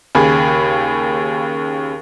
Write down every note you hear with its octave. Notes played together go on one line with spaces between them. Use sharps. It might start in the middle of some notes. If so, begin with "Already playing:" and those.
D#2 C#3 G#4 B5